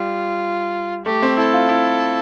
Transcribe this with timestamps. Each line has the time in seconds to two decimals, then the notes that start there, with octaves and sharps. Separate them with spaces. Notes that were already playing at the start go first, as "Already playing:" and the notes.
Already playing: G3 F4
1.05 A3 G4
1.22 C4
1.37 E4 A4
1.54 F4
1.69 E4